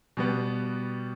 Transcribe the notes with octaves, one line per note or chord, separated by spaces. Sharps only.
B2 G3 B3